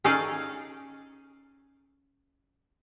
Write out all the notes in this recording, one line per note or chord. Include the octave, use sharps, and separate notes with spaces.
C#4 D#4 G#4 A4 D5 F5